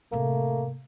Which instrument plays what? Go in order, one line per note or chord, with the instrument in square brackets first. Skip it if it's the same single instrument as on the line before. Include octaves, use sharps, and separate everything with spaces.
[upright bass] A2 C3 [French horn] A3 [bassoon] A#3